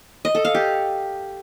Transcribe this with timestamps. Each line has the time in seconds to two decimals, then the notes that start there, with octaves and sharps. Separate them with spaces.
0.25 D#5
0.35 A4
0.45 F5
0.55 G4